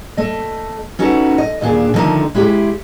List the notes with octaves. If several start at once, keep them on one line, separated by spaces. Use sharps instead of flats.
A3 D#5
C#4 D#4 F#4 A4 B4
D#5
D#2 A#2 D4 G#4
D3 D#3 F3 G3 A3 D#4
G#3 E4 G4 G#4